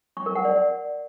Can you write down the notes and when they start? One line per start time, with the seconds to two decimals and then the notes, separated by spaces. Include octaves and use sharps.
0.17 C#6
0.26 A#4
0.35 F#5
0.45 D5